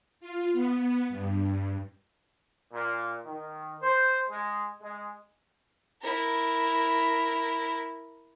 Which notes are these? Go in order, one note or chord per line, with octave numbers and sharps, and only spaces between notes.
F4
B3
G2
A#2
D#3
C5
G#3
G#3
E4 A#4